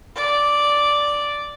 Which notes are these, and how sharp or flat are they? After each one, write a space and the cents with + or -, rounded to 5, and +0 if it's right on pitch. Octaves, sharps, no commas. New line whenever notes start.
D5 -5